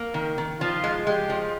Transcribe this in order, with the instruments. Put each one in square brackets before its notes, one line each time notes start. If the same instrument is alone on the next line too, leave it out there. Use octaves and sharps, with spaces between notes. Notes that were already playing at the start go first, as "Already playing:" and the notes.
Already playing: [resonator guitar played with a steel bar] A#3
D#3
D#3
[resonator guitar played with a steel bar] F3 [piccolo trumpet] F4
[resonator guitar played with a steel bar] G#3
[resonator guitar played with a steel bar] G#3 [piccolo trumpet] G4
[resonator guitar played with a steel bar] F3